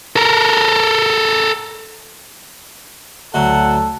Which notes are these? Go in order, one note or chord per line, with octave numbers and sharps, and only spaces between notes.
A4 A#4
D2 F#3 A4 F#5